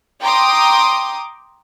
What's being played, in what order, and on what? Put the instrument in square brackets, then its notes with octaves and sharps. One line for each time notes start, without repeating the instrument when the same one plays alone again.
[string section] G5 A#5 C6 D6 D#6